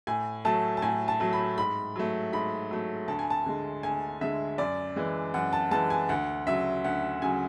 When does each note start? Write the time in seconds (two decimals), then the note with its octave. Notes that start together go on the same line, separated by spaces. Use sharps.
0.07 A2 G#5
0.45 F#3 A3 A5
0.77 A5
0.82 A2 G#5
1.08 A5
1.20 F#3 A3
1.33 B5
1.58 G#2 B5
1.96 F#3 A3
2.33 G#2 B5
2.71 F#3 A3
3.08 D2 A5
3.19 G#5
3.30 A5
3.46 D3 G#3
3.83 D2 G#5
4.21 D3 G#3 E5
4.58 F#2 D5
4.96 E3 G#3
5.34 F#2 F#5
5.53 A5
5.71 E3 G#3 A5
5.90 G#5
6.09 D2 F#5
6.47 C#3 F#3 E5
6.84 D2 F#5
7.22 C#3 F#3 G#5